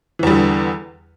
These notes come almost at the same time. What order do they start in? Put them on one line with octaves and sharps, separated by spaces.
E3 E2 G3 D3